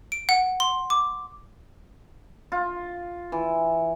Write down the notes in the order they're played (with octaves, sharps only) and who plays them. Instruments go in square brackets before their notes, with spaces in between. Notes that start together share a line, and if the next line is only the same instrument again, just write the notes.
[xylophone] D7
F#5
C6
D6
[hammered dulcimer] F4
E3